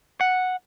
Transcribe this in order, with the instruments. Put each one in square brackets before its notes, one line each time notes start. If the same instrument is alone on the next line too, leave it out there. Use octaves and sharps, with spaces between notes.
[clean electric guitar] F#5